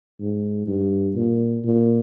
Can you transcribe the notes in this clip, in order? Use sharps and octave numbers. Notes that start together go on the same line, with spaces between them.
G#2
G2
A#2
A#2